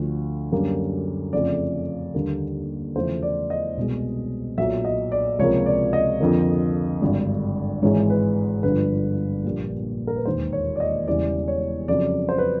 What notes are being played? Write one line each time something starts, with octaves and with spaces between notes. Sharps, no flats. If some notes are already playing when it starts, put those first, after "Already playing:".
Already playing: D2 D3 F3
F#2 D3 G3 A#3
F2 C#3 F3 A3 D5
D#2 D3 G3 A#3
E2 C#3 F3 A3 C5
D5
D#5
C2 B2 G#3
B1 A#2 F#3 E5
D#5
D5
C#2 C3 F3 A#3 C#5
D5
D#5
F2 D3 F3 A#3
G#1 G2 D3
G#1 G#2 E3 G#3 C#5
B4
G1 G2 D3 F3 B4
A#1 A#2 G3 A#3
A#4
B4
E1 D#2 D#3 C5
C#5
D5
D#5
E1 E2 C#3 E3 G3 D5
C#5
F2 C#3 F#3 D5
C5
B4